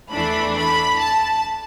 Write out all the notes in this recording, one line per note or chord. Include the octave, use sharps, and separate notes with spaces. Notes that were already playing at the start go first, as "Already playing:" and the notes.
E2 E3 A3 D4 B5
B5
A5